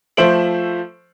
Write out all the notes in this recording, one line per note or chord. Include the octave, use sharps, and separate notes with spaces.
F3 A3 C5 E5 D7 F#7